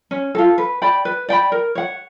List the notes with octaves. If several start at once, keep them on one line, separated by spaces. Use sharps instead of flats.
C#4
F4 A4
B4
D5 G5 B5
B4
D5 G5 B5
A#4
C#5 F#5